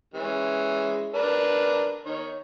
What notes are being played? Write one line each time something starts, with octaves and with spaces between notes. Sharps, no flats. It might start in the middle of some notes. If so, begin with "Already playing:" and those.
E3 G#3 C#4
D4 A#4 B4
D#3 D#4 C#5